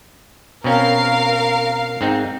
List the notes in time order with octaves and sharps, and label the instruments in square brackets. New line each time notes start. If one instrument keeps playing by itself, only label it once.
[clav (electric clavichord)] B2 C4 C#4 [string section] A#4 F5
[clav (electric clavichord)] G#2 C4 D#4